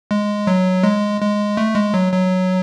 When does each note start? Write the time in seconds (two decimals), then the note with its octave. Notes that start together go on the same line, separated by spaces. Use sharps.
0.11 G#3
0.47 F#3
0.83 G#3
1.21 G#3
1.57 A3
1.75 G#3
1.94 F#3
2.13 F#3